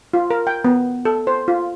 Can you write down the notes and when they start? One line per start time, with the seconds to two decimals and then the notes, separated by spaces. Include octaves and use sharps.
0.14 F4
0.30 A#4
0.47 G5
0.65 B3
1.05 A4
1.27 C5
1.48 F4